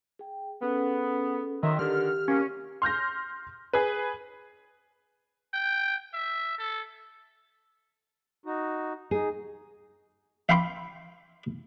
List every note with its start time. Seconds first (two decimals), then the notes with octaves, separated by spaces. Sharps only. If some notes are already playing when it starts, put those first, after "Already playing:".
0.19 G#4 G5
0.62 B3 C#4 G#4 A4
1.63 D#3 F#3 D#5 E5 C6
1.79 D3 D#3 G4 F6
2.28 C3 F#3 A#3 C#4
2.82 C6 F6 G6 A#6
3.73 G#4 B4
5.54 G5
6.13 E5
6.59 A4
8.46 D#4 F#4
9.11 D#4 G#4
10.49 E5 F5 G5 B5 C6 D6